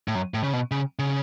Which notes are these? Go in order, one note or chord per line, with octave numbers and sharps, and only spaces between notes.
A2
F#2
A2
C#3
B2
C#3
C#3